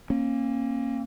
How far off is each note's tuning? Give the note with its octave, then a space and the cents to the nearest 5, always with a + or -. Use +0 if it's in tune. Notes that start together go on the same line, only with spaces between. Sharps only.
A#3 +0 C#4 -35